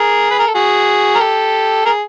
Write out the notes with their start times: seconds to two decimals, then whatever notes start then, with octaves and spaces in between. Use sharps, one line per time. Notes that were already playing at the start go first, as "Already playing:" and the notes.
Already playing: G#4 A#4
0.31 B4
0.39 A#4
0.47 A4
0.55 F#4 G#4
1.15 A#4
1.20 G4 A4
1.85 G#4 A#4